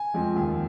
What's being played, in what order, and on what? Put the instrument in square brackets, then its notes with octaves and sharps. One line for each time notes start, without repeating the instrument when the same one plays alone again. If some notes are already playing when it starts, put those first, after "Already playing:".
Already playing: [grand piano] G#5
F2 F3 G#3
D#2